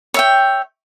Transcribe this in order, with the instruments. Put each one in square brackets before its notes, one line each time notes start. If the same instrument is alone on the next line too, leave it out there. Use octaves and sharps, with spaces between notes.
[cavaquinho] C#5 E5 G5